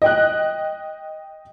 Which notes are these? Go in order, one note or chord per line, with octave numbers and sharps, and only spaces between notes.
D#5 G5 F#6